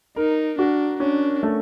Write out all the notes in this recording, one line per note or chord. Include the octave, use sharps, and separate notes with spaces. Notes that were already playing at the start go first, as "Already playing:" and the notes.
D#4 A#4
D4 F#4
C#4 D4
A3